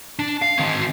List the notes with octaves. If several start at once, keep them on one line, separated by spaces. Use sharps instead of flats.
D4
F5
D#3 C4